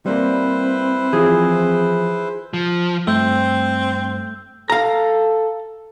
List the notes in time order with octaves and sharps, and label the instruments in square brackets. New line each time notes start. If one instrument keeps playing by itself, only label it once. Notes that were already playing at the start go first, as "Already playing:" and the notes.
[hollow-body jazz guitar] G3 A#3 [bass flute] C4 [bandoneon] E4 B4 C5
[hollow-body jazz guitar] E3 F3 [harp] G#4
[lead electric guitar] F3
[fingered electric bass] G2 [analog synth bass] A3 [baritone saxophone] C4 [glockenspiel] E6 G6
[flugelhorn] A4 [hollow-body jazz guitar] F5 A#5